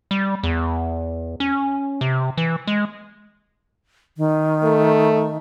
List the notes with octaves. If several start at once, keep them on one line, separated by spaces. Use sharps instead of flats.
G3
E2
C#4
C3
E3
G#3
D#3
A3